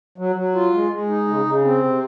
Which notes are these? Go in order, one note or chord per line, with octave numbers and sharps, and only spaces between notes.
F#3
F#3
F4
G#3
G#3
D#4
C#3
C#3
C4
C3